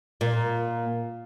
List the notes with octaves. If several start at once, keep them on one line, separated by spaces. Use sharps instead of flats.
A#2